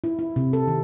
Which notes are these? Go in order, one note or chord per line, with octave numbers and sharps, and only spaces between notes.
E4
E4
C3
A4
D#3